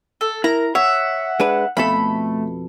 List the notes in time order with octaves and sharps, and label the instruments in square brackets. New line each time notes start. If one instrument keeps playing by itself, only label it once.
[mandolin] A4
[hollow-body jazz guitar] E4 [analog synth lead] A#4 [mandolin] A#5
[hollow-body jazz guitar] C#5 [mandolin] E5 [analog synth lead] F#5
[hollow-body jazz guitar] G#3 D4 B4
[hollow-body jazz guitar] F2 B2 A4 [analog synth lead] A3 [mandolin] B5